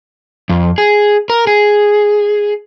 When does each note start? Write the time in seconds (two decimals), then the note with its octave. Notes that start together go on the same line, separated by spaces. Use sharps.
0.49 F2
0.78 G#4
1.30 A#4
1.47 G#4